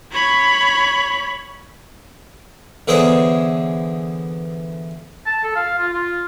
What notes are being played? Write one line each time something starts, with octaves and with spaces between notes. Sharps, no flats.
C#5 B5
D3 E3 B3 G#4 C5 C#5
A5
A4
F5
F4
F4